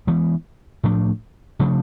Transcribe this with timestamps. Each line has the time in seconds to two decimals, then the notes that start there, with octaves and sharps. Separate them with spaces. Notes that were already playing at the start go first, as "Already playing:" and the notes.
0.07 E3 G#3 B3
0.83 A2 F3 A3 D4
1.59 C3 F3 A3 D4